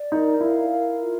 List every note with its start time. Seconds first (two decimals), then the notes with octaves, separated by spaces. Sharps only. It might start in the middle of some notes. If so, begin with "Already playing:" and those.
Already playing: D5
0.11 D#4 A#4
0.40 E4 F5
0.69 A#4
0.98 F4